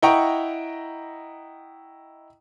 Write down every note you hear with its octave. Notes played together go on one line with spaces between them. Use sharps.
E4 D#5 F#5 G5 A#5 C#6